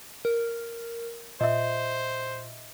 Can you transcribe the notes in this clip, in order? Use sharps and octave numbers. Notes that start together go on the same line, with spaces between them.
A#4
A#2 C5 D#5 E5